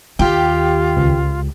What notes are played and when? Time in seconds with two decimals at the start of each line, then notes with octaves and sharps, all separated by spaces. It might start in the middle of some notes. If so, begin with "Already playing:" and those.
0.19 D#2 F4 G4
0.97 C#2